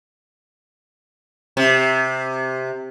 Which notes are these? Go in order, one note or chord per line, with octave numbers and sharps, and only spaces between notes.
C3